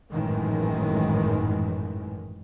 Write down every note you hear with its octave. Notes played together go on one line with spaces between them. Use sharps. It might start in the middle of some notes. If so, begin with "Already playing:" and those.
G#1 F#2 A2 D#3 E3 G#3